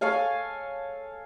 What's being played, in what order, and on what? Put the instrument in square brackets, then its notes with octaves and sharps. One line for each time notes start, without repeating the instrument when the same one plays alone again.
[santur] A4 C#5 F5 G#5